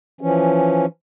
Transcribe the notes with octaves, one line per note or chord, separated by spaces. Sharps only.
E3 F3 C#4